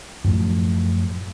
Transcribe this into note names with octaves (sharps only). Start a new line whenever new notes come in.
F#2 A2 F3 A3